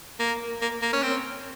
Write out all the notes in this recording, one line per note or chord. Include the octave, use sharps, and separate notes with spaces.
A#3
A#3
A#3
C#4
C4